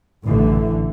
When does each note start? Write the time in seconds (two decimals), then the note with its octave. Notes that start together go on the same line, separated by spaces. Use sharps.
0.25 A1 D3 E3